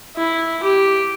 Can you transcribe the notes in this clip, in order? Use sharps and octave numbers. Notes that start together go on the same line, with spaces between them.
E4
G4